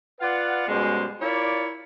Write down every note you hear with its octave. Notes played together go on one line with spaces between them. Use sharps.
F4 B4 D5 F5 F#5
F#2 B2 G3 G#3 F#4 C5
E4 F4 A#4 C#5 D5